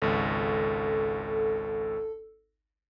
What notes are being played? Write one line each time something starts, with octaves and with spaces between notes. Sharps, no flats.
G#1 C#2 A4